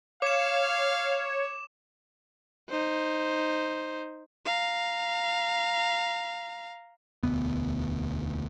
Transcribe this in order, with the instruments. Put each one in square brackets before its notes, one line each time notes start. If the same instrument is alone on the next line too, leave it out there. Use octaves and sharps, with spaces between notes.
[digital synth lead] C#5 [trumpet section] F5 [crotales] D6 E7
[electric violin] D#4 C5
F5 A#5
[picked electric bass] E1 D2 G2 B3